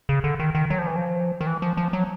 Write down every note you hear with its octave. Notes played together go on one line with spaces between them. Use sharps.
C#3
D3
D#3
D#3
F#3
F3
E3
F3
D#3
E3
F3
F3
F#3